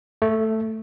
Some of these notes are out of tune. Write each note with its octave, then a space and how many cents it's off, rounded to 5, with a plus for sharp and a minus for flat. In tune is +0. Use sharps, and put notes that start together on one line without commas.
A3 +5